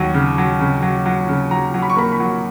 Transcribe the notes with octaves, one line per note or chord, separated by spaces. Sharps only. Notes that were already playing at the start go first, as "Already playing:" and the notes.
Already playing: D#2 F#3
C#3
F#3
C#3
F#3
F#3
C#3
F#3 A#5
F#3
B5
C#6
A#3 B5
B5
F#3